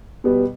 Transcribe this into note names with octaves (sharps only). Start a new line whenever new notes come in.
B2 G3 B3